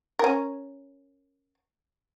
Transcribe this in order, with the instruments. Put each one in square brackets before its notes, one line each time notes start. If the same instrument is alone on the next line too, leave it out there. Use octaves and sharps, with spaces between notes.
[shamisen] C#4 A#4